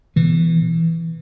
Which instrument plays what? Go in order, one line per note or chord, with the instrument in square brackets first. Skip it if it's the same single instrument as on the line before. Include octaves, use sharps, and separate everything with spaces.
[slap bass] B2 E3